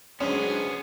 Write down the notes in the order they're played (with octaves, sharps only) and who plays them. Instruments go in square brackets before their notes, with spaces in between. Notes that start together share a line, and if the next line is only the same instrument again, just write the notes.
[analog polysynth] F#3 G#3 D4 [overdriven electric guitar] B3 C5 [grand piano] C#4 [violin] G#4